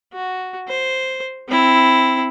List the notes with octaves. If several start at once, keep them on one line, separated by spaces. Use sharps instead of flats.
F#4
C5
C4 E4